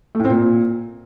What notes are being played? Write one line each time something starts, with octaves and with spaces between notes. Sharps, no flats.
A3
A2
C4
A#2